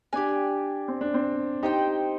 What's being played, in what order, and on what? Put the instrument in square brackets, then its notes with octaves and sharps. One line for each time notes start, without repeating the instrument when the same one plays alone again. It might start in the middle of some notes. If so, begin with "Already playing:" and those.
[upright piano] D4 [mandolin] G4 D5 G#5
[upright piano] C4
D4
C4
[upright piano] D#4 [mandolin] G4 C5 G5